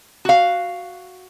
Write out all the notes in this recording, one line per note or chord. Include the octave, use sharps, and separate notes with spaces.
F#4 F5